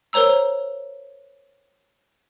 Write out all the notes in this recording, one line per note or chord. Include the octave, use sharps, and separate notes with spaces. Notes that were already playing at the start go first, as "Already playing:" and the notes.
A#4 C5 C#5 A#5 E6